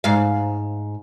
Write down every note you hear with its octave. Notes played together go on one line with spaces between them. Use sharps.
G#2 F5